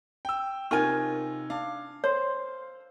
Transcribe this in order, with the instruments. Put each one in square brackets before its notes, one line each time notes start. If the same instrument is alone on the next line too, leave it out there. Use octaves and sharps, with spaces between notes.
[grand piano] G5 E6
[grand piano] C3 D#4 G#6 [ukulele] F4 A#4 G#5 [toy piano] C#6
[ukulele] D4 [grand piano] F5
[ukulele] C5 [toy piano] C#5